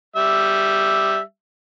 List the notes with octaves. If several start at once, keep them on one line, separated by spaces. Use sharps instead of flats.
G3 E5